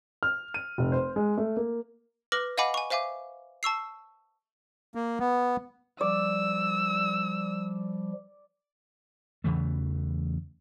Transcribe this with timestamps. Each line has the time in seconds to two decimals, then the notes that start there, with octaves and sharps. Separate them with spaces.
0.23 F6
0.54 D#7
0.78 F1
0.92 C5
1.16 G#3
1.38 A3
1.57 A#3
2.32 B4 D6 F6 A#6 F#7
2.58 D#5 F5 F#5 G#5 B5 D6
2.74 G#5 C#6
2.90 C5 E5 F5 G#5 D6
3.63 A5 C#6 E6 C7
4.95 A#3
5.20 B3
6.01 F3 G3 D5 E6
9.44 E2 C#3 E3 A3